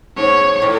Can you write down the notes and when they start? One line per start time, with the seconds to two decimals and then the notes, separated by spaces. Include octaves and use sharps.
0.17 G#2 C#5
0.62 A2